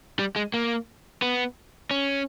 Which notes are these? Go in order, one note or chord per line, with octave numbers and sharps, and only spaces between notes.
G3
G#3
A#3
B3
C#4